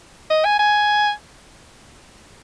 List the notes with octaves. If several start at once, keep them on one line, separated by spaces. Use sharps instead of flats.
D#5
G#5
G#5